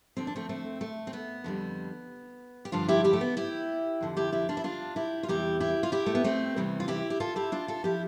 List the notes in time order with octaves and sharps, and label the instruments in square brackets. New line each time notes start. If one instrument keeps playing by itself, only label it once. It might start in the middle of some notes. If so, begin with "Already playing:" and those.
[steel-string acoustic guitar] D2 D3 F3 C4
D4
A3 C4
A3 C4
A3
C4
B3
F2 D3 G3
G4
G2 D3 F3 D4 F4
E4 G4
E4 G4
A3
B3
E4 G4
F2 D3 F3
E4 G4
E4 G4
D4 F4
E4
D4 F4
E4 G4
F4
E2 C3 E3 G3 E4 G4
E4 G4
F4
E4 G4
A3
B3
A3 C4
E2 C3 E3 G3
F4
E4 G4
G4
F4 A4
E4 G4
D4 F4
F4 A4
F3 E4 G4